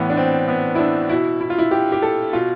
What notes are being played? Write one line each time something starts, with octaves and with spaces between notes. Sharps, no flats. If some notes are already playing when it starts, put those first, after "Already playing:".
Already playing: A2 E3 B3
D4
C4
B3
E4
D4
B2 E4
E4
F4
E4
G4
G4
A4
B2 F4